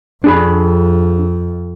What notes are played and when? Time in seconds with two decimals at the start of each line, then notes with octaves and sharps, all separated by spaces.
0.24 F2 D4 G#4 B5